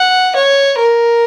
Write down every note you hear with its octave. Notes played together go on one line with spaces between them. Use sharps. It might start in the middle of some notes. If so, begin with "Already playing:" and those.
Already playing: F#5
C#5
A#4